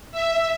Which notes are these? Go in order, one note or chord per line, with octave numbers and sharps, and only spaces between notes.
E5